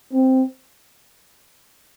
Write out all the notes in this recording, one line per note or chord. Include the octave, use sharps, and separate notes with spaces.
C4